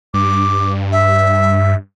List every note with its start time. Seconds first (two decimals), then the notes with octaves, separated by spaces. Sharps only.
0.14 G2 D6
0.92 E5